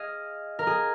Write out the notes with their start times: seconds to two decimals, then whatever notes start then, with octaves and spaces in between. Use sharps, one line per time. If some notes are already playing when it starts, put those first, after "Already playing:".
Already playing: G#4 D#5 F5
0.59 A#4
0.67 G#4